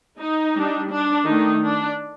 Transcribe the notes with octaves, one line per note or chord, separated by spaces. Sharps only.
D#4
G3 D4
D4
D#3 A3 D4 D#4
D4